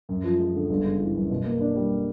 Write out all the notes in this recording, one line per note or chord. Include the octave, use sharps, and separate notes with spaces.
F#2
F3
G#3
D3
G1
C#3
E3
F#2
B2
A#3
D4
G3